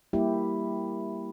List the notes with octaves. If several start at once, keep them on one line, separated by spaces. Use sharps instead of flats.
G3 A#3 E4 G4